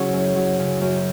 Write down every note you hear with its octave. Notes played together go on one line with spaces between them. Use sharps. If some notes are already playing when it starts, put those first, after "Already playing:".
Already playing: C#3 F#3 C#4 E4 F#4 G#4 C#5
F#2
F#3
C#3
F#2